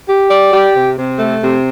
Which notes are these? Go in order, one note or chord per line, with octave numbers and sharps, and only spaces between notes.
G4
D5
G4
C3
C3
A3
C3